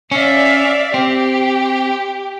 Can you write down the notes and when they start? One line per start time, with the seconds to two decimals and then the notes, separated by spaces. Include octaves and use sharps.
0.11 C#4 D5 E5 F5
0.94 C4 G4